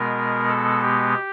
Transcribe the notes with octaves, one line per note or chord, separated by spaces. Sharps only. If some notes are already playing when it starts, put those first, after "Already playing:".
Already playing: B2 G#3 B3 A#4
A4
G4